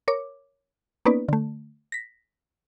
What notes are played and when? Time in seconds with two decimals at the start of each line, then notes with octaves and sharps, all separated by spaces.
0.08 A#4 C#5 D6
1.05 A#3 B3 C#4 D#4 B4 D5
1.29 D3 A3
1.92 A#6 B6